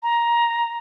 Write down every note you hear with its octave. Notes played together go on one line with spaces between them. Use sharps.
A#5